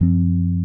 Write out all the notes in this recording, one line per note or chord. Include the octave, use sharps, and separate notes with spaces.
F#2 F3 C4